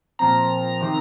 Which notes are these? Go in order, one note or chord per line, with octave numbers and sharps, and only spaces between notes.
A#2 F3 C4 A#5
C3 D#3 C4